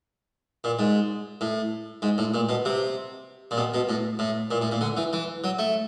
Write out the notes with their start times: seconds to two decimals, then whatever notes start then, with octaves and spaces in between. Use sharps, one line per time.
0.64 A#2
0.79 G#2
1.41 A2
2.02 G#2
2.18 A2
2.34 A#2
2.49 B2
2.65 C3
3.51 A#2
3.57 B2
3.74 B2
3.89 A2
4.19 A2
4.51 A#2
4.62 A2
4.72 A#2
4.81 D3
4.97 E3
5.13 E3
5.44 F#3
5.59 A3